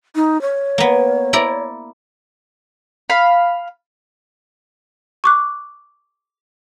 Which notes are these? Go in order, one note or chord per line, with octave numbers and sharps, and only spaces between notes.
D#4
C#5
A#3 B3
E4 D5 A#5
F5 B5
C#6 D6 F#6